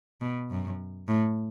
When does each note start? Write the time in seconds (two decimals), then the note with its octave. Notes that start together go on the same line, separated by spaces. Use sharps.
0.21 B2
0.50 F#2
1.08 A2